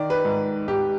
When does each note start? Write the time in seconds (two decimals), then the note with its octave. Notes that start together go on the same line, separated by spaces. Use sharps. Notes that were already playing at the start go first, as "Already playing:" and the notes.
Already playing: D#3 D5
0.10 B4
0.25 G#2
0.68 G#2 G4